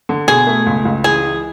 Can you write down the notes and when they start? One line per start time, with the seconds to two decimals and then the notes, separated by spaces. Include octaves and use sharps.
0.09 D3
0.28 B2 G#4
0.47 A3
0.66 C#2
0.85 C#2
1.04 E3 G#4
1.24 E3